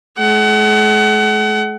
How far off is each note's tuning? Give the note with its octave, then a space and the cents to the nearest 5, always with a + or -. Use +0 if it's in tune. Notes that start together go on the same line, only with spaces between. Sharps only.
G#3 +45 F#5 +30